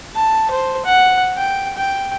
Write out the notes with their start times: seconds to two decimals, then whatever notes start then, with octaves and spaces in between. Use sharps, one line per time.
0.15 A5
0.51 C5
0.85 F#5
1.37 G5
1.77 G5